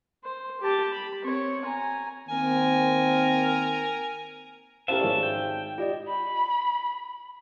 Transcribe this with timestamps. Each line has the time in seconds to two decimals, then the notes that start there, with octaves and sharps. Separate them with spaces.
0.24 C5
0.61 G4 A5
0.93 B5
1.24 C4 C#5
1.66 G#5 A#5
2.29 D#3 A#3 C4 A#4 G#5
4.88 C#4 G4 A#4 C5 E5 F5 A5
5.00 G#1 G#4 C#5
5.23 G5
5.78 F4 G4 D5 D#5
6.09 B5